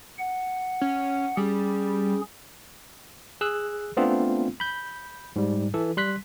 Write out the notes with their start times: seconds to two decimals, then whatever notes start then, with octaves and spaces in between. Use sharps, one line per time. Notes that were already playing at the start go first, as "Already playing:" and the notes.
0.18 F#5
0.81 C#4
1.37 G3 C#4 G#4
3.41 G#4 E6 F#6
3.97 A3 B3 C4 D4 F4
4.60 B5 G6
5.36 G#2 G3
5.74 E3 A4
5.97 G3 C6 F#6 B6